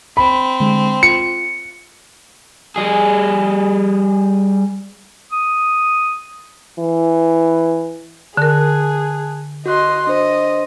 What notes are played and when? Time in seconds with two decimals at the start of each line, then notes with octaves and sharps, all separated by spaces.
0.17 C4 B5
0.60 D3 G#3
1.03 F4 C#7
2.76 G3 G#4
5.32 D#6
6.79 E3
8.37 D3 G#4 A#4 A5 F#6
9.66 F#4 D#5 C6 C#6 F#6
10.07 D4 C5 D#5 C6